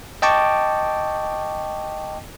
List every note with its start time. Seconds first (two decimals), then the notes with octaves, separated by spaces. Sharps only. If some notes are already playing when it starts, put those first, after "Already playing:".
0.22 D#5 G5 A5 C#6 D6